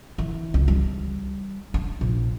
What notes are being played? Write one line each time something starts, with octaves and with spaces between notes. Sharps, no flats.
E3
C#2
G3
D4
A#1